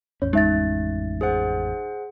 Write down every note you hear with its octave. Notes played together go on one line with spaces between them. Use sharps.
A1 F2 C#4 C#5
G#3 D#4 E5 A6
G#4 C5 F#5